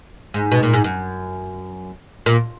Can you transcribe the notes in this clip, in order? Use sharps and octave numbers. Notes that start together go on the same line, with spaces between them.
G#2
B2
A#2
G#2
F#2
A#2